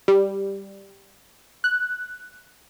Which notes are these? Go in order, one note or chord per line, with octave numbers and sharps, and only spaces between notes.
G3
F#6